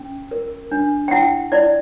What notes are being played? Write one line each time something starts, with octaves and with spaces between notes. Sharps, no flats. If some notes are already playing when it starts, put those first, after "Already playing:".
Already playing: C#4
A#4
D4
G5
E4 F#5
E4 D5